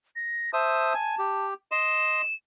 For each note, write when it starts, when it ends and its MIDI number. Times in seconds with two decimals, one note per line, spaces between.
0.16 0.53 94
0.53 0.93 72
0.53 0.93 76
0.53 1.46 81
0.53 0.93 87
0.94 1.15 80
1.19 1.54 67
1.72 2.22 75
1.72 2.22 84
1.72 2.34 100